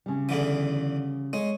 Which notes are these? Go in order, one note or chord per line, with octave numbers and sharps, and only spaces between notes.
C#3 G3
E2 D3 E3
G#3 C#5